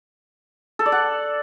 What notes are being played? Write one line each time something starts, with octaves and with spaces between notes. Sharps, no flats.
A4
D5
F#5